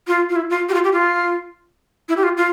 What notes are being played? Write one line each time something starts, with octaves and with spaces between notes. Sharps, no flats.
F4
F4
E4
F4
G4
F4
G4
F4
E4
G4
F4
F4